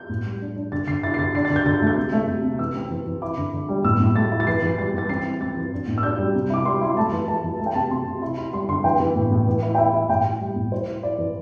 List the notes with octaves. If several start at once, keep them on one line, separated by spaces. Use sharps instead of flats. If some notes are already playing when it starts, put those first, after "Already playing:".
Already playing: G6
A2
G3
D4
D4
D3 A6
D3 C7
E4 A6
C7
D3 A6
D4 C7
A6
D3
G6
D3 A6
A3
G6
C3
A3
C3
C3
E3 E6
C4
E3
E3
E4 D6
D3
D3
G3
A2 E6
A2
A3 A6
E4
A6
E3 C7
E3 C7
G3 A6
E3 A6
C4 C7
E4
C4 A6
E3
D4
A2
E6
D4 G6
G3
C3
E4 D6
G3 C6
E4 C6
A3 A5
E3
A3 A5
E3
A3 A5
G5
C3 A5
C3 C6
C3
E4 C6
E4
G3 C6
D3 C6
E3 G5
E3
A2
A2
E3
E4
G5
E4 E5
E4 E5
A2 G5
E4
G3
A2
E4 C5
E4
E4 D5
E3